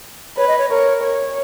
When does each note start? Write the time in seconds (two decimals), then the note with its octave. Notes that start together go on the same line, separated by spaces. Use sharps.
0.37 B4 C#5
0.48 D#5
0.58 C#5
0.70 A#4 C#5
1.03 C#5